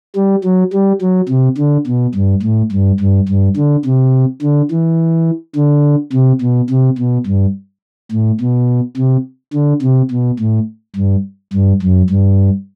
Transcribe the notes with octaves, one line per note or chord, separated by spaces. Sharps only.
G3
F#3
G3
F#3
C3
D3
B2
G2
A2
G2
G2
G2
D3
C3
D3
E3
D3
C3
B2
C3
B2
G2
A2
B2
C3
D3
C3
B2
A2
G2
G2
F#2
G2